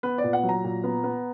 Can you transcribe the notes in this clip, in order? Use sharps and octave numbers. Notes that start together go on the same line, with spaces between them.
B3 B4
D5
A#2
F#5
F#3
A#5
A#2
B3
B3